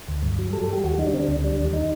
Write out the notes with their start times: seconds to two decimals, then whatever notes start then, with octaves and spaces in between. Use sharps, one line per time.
0.08 D2
0.23 G2
0.39 F#3
0.53 G3 A4
0.63 A4
0.68 G3 G4
0.84 D#2 F#4
0.98 G3 D#4
1.06 D4
1.13 D3 C4
1.20 D4
1.28 D2
1.44 G3 D4
1.59 D#2
1.73 D#4